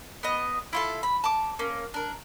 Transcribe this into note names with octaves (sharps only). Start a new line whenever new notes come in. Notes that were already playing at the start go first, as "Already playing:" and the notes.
B3 D#5
E4 F4 A4
B5
A5 D6
A#3 C#4
D4 A#4